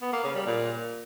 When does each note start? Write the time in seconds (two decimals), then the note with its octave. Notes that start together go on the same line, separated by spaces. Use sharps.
0.02 B3
0.13 A#3
0.24 C#3
0.35 G3
0.46 A#2